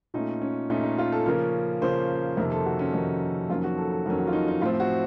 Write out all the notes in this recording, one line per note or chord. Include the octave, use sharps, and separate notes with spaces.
A#2 A3 C#4 D#4
C#4
A#2 A3 C#4 D#4
D#4
F4
A4
C#3 F3 A#3 C#4 A#4
C#3 F3 A#3 C#4 C5
F2 C3 D#3 A#3 A#4
A4
F#4
C#4
F2 C3 D#3 A#3 D#4
F2 D#3 F#3 A#3 C#4 F4
F#4
A4
A4
F2 D#3 F#3 A#3 C#4 A#4
F#4
F4
D#4
D#4
A2 F3 C4 F4
F#4